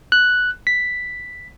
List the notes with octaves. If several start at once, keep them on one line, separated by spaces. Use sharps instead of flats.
F#6
B6